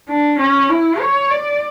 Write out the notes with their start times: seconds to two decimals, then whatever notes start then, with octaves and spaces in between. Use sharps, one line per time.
0.09 D4
0.39 C#4
0.69 E4
1.00 C#5
1.30 D5